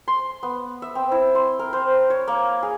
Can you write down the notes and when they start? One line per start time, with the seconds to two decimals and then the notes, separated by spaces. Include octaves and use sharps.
0.08 C6
0.43 B3
0.82 E5
0.95 C4
1.12 E4
1.35 C6
1.59 A#4
1.73 C5
2.10 C#5
2.28 A#3
2.63 G#4